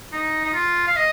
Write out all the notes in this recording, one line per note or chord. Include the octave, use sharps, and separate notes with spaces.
D#4
D#4
F4
F5
D#5